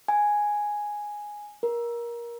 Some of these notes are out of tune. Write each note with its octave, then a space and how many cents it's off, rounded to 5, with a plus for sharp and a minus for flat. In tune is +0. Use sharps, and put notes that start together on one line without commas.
G#5 +0
A#4 +20